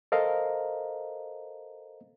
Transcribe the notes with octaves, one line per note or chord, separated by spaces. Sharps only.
A4 A#4 C5 D#5 F5 A#5